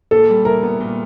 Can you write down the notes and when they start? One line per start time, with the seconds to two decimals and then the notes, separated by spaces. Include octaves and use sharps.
0.11 A#2 A4
0.29 G3
0.45 E4 A#4
0.63 B3
0.80 A#2